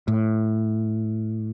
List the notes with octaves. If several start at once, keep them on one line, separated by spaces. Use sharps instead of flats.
A2